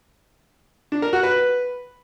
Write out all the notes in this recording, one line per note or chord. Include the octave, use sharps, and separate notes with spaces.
D4
A#4
F#4
B4